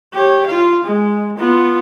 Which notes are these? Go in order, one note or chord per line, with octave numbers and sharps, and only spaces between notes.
G4 C#5
F4 F5
G#3
B3 F4